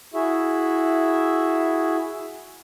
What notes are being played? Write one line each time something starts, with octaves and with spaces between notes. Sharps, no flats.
E4 F#4 G#4 E5